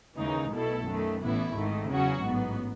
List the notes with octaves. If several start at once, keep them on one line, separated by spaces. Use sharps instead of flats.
D#2 C#3 E3 G#3 D#4
B1 B2 A3 E4 A4
F#2 D#3 A3
A1 A2 E3 B3 E4
G#1 G#2 D#3 A3
E2 C#3 F#3 C#4 F#4
A1 G#2 F#3 B3